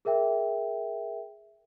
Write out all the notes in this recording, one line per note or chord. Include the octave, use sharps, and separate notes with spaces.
G#4 A#4 E5 G5